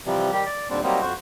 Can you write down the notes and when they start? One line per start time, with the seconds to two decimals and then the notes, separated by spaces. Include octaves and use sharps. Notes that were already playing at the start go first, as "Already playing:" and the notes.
0.06 C3 E3 F3 G3
0.32 D#3 G3 G4
0.46 D5
0.70 D#2 A#2 D3 G3 C4 D4
0.83 F#3 G3 A#3 C4 D#4
1.01 F2 F#4 C5